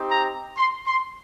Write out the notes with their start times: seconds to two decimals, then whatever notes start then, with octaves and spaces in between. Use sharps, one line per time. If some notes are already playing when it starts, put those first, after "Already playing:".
Already playing: C4 D#4 G4
0.10 A#5
0.57 C6
0.87 C6